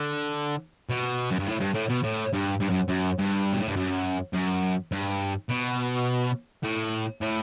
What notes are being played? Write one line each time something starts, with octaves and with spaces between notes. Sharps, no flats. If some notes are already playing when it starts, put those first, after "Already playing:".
Already playing: D3
B2
F#2
G2
A2
G2
A2
B2
A2
G2
G2
F#2
F#2
G2
B2
A2
G2
F#2
F#2
G2
B2
A2
A2